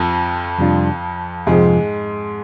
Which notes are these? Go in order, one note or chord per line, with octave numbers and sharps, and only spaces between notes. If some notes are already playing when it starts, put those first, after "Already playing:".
Already playing: F2 F3
F2 C3 G3 D4 F4
F2 G#2 C3 F3 G#3